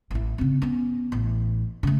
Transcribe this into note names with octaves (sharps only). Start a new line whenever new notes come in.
A1 E4
C#3 C4
B3 C#4
A1
C#3 A3